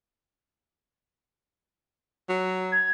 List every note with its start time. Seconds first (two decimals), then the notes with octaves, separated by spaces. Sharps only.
2.29 F#3
2.72 G#6